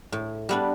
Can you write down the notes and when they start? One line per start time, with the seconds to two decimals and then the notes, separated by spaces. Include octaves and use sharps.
0.12 A2
0.49 G3 B3 D4